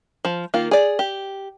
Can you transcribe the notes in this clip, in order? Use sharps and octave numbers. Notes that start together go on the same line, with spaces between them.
F3
D#3 A#3 F4
G#4 D5
G4